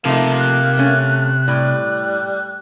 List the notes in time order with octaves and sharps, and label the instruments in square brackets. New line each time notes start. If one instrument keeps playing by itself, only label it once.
[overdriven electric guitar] C3 [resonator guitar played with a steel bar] F3 A3 D#4 [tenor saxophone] A#3 [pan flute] A5
[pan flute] F#6
[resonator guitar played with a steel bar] A3 C#4
[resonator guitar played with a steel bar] A2 [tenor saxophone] G3